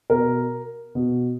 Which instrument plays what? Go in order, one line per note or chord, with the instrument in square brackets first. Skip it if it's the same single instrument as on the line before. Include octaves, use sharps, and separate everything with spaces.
[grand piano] B2 A#4
B2